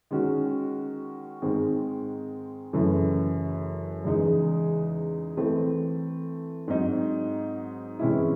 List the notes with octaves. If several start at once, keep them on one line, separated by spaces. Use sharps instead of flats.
D#3 G#3 C#4 F#4
G#2 D#3 G#3 C4
F#2 C#3 E3 A3
E2 C#3 G#3 D#4 G#4
E3 A3 C4
G#2 F#3 C4 D#4
C3 E3 G#3 C#4 E4